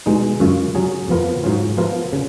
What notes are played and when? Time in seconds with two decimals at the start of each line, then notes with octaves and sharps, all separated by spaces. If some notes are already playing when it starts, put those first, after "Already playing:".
0.06 B2 G#3 D#4
0.40 F#2 C#3 G#3 C#4 F4
0.75 F#3 C#4 G#4
1.08 F2 F3 B3 F4 A#4
1.44 G#2 F#3 C#4 F4
1.77 F3 B3 F4 A#4
2.13 C#3